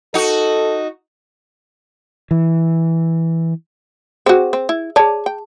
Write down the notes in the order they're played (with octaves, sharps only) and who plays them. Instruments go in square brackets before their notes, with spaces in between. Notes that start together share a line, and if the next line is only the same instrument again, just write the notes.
[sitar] D#4 F#4 [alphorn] A4
[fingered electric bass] E3
[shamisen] C4 F#4 [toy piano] G#4
[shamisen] C4
E4
[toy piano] G#4 A5 [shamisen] C#5 D5
[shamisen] G5